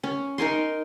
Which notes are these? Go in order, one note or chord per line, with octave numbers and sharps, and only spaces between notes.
C#4
D#4 A#4 G#5 C6